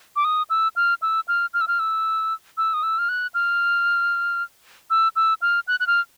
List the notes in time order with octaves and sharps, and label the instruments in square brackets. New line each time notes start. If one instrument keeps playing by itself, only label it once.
[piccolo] D6
D#6
E6
F6
E6
F6
F6
E6
F6
E6
E6
D#6
E6
F6
F#6
F6
E6
E6
F6
F#6
F#6
F6